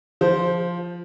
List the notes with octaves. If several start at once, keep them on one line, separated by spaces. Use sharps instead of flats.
F3 C5